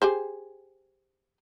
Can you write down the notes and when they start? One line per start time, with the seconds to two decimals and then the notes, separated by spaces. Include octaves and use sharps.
0.02 G4 G#4 C5